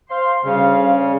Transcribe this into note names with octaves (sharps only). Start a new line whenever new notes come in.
C5 F5 C6
D2 C#3 G3 F5